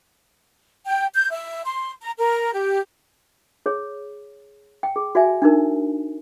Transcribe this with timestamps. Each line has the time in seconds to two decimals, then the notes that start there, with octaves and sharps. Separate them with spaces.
0.85 G5
1.14 G6
1.30 E5
1.64 C6
2.01 A#5
2.17 A#4
2.53 G4
3.66 G#4 C#5
4.83 G5
4.96 G#4
5.15 F#4 D5 E5 G#5
5.42 D4 D#4 A#4